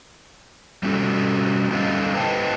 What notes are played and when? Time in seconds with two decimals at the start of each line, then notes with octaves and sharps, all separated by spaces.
0.83 G3 A3 C#4 F#4 A4
1.70 G3 C#4 D#4 A4 D#5 F5
2.14 B4 C5 D#5 G5 A5